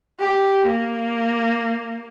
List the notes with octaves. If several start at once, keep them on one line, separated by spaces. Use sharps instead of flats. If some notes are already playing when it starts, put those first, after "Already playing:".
G4
A#3